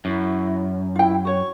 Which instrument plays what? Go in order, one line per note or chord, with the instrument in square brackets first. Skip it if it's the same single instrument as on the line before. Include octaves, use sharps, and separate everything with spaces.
[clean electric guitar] F#2 [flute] E4
[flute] E4 [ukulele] F4 G5
[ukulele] F#4 C#5 [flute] C#6